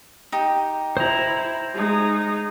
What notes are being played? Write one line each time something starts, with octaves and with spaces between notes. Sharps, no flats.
D#4 G4
E4 C5 A#5
G#3 D#4